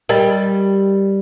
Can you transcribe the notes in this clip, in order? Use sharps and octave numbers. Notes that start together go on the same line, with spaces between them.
G3 A#4 D#5 G5